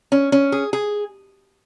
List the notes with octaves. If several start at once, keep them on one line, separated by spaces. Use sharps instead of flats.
C#4
C#4
G#4
G#4